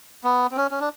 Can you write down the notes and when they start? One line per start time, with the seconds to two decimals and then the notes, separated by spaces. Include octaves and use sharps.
0.24 B3
0.51 C4
0.57 C#4
0.71 C#4
0.80 D4